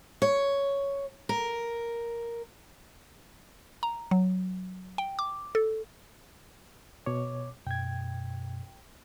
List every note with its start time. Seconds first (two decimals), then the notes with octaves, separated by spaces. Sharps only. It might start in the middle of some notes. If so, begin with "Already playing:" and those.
0.22 C#5
1.29 A#4
3.83 A#5
4.11 F#3
4.98 G5
5.19 D6
5.55 A4
7.06 B2 C#5 D6
7.67 F#2 B2 G5 G#6